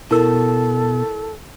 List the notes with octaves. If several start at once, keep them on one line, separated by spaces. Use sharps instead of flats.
B2 E4 A4 A#4 E6